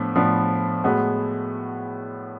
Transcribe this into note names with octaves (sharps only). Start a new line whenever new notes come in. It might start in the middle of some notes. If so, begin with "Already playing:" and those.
Already playing: A2 F3 B3 D4
A2 F3 B3 D4
A2 G#3 B3 F#4